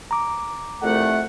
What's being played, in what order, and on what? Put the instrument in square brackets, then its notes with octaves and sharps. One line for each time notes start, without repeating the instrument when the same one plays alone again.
[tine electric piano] A#5 D6
[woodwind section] C2 F2 A3 [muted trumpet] F#5